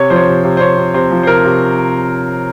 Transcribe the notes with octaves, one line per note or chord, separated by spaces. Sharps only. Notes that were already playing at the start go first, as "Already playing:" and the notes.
Already playing: C3 C#5
F3 C5
C#5
C3
C3
C5
C3 C#5
C3
C3 C5
F3
C5
C3 A#4
C3